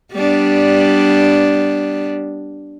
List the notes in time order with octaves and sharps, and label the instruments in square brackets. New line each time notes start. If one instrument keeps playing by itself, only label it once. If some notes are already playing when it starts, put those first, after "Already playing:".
[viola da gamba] G3 B3 D4